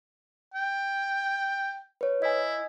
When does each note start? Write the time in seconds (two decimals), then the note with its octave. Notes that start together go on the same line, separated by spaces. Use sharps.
0.54 G5
2.01 B4 C#5
2.22 E4 D#5 G#5